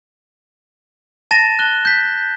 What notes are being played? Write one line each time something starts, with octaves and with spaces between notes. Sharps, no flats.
A5 A6 A#6 E7
F#6 G7
G6 B6